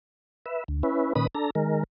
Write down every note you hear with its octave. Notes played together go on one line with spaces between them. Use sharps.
B4 E5
D2
C#4 E4 B4
A#2 D#3 C#4 B4 B5 D#6
D4 A4 A#5
D#3 G#3 A#4